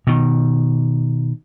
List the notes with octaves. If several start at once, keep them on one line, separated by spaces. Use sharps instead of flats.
B2 D#3